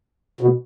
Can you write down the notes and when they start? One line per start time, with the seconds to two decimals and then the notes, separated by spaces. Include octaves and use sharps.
0.41 B2